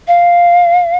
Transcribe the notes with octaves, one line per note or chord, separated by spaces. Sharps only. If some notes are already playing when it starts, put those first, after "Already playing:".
F5